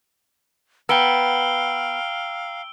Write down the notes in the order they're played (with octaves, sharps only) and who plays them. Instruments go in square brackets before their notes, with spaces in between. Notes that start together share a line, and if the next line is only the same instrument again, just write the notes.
[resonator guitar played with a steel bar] B3 [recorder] F5 [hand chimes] G5 A#5 [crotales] E6 D7 G7